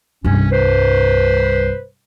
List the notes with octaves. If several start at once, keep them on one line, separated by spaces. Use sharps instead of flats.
C2 G2 C#4
B4 C5